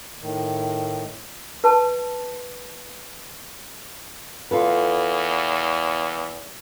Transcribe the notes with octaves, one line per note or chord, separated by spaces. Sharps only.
A2 D#3
B4 A5
E2 F4 A4 B4